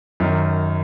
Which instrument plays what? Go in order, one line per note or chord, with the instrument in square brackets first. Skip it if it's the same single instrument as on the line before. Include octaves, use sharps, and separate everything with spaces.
[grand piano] F#2 D#3